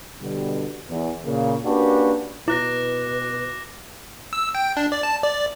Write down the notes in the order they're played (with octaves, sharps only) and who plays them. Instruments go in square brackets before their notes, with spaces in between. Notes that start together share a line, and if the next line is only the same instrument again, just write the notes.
[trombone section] B2 D3 G3
E2
A#2 C#3 A#3
A#3 C#4 D4 F#4 G4 B4
[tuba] B2 [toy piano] E4 [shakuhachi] B4 [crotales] D6 F#6 A#6
[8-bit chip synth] E6
G5
D4
D5
A5
D5